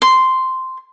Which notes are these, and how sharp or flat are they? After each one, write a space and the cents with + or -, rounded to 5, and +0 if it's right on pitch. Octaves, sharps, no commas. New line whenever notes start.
C6 -5